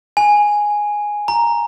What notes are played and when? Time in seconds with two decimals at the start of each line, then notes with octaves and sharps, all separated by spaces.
0.17 G#5
1.28 A#5